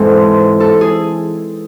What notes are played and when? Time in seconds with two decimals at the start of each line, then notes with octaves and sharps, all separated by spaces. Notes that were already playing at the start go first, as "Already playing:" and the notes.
Already playing: G#2 E3 G#3 C4 A4
0.60 A4
0.81 G#4